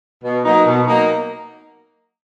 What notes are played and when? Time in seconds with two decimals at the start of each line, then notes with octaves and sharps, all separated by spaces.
0.24 B2
0.44 F#3 A#3 D#4
0.66 B2
0.87 F#3 A#3 D#4